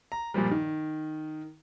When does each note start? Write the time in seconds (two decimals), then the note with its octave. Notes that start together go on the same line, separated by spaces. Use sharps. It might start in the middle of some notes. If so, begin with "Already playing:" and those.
0.12 A#5
0.34 G2 A#2 F3 G3
0.51 D#3